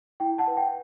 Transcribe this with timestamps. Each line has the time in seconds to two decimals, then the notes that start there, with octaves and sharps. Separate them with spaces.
0.20 E4 G5
0.38 F#5 A5
0.47 B4
0.57 G5